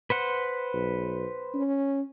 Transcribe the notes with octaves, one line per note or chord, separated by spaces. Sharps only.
B4 C5 F#5
B1
C#4